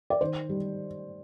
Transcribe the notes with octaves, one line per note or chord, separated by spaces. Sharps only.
D5
D#3 C5
G3